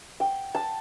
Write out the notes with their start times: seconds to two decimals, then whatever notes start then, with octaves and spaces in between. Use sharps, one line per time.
0.20 G5
0.55 A5